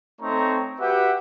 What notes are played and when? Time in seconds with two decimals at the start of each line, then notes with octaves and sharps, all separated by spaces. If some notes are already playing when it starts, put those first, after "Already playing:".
0.21 A3 C4 D#4 C#5 A#5 C#6
0.80 F#4 G4 B4 E5 F#5 G5